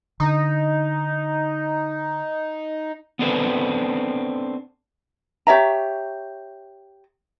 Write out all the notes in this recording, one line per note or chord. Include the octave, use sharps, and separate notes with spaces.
D3 D#4
B3 C4 D4 A4 B4
G4 C#5 E5 A#5